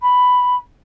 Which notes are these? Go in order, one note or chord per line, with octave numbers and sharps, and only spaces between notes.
B5